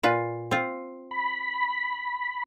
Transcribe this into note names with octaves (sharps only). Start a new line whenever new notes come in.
A#2 F4 B4
C4 F4
B5